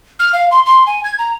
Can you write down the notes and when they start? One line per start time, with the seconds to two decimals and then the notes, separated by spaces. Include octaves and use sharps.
0.19 F6
0.33 F5
0.51 C6
0.66 C6
0.87 G#5
1.04 G#6
1.19 A#5